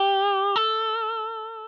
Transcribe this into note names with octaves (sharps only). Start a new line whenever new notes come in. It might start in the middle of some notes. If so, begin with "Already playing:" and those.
Already playing: G4
A4